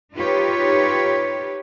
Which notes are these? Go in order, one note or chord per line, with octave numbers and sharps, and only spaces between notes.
D#4 F4 G4 B4 C#5